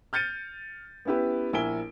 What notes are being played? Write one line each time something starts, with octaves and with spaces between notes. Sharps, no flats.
F6 G6 A6 C#7 D#7
B3 C#4 E4 G4 B4
A#1 E4 A#4 G#5 D7 G7